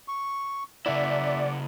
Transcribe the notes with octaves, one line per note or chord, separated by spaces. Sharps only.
C#6
C#3 A#3 E4 D5 E5 F#5